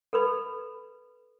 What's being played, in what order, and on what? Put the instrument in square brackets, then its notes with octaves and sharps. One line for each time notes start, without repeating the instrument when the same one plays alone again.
[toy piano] A4 B4 B5